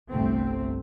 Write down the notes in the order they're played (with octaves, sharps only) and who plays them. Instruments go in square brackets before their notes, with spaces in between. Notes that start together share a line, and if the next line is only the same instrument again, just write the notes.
[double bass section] G1 C2 C3 A3 C4